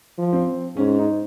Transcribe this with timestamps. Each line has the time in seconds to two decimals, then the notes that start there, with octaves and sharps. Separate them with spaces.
0.18 F3
0.33 C4
0.76 G#2 C#4
0.99 D#4